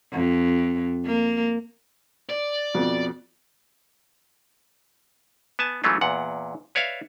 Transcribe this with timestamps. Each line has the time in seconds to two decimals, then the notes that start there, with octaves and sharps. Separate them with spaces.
0.13 F2
1.06 A#3
2.30 D5
2.74 F2 B2
5.59 B3 G#5 A5
5.84 E3 F#3 G#3 A3 C#4 F4
6.01 E2 A#2 F#5
6.75 B4 C#5 D5 E5 F5